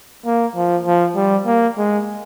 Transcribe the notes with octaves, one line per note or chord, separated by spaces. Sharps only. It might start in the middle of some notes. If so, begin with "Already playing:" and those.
A#3
F3
F3
G3
A#3
G#3